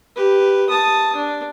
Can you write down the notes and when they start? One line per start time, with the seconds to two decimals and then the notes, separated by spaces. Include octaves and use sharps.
0.16 G4 B4
0.70 A5 D#6
1.16 D4